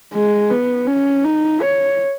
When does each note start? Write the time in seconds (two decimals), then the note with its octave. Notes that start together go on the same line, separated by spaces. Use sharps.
0.14 G#3
0.51 B3
0.87 C#4
1.25 D#4
1.62 C#5